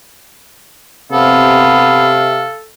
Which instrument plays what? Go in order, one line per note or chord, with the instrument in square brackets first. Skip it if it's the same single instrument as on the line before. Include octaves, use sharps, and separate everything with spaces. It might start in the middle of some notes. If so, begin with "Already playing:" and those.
[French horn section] C3 [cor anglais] B3 [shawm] A4 [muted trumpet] F5